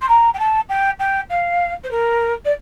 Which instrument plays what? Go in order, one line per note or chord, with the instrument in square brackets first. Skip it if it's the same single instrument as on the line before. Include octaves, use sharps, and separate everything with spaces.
[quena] C6
A#5
G5
A5
G5
G5
F5
C5
A#4
D5